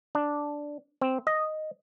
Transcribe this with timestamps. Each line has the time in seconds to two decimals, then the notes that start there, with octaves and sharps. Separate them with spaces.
0.15 D4
1.02 C4
1.27 D#5